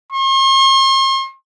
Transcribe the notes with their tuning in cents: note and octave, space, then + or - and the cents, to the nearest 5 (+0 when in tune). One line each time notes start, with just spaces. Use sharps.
C6 +45